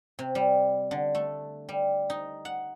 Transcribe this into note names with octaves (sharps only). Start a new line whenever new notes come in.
C3
G3
D3
A3
G3
D#4
F#5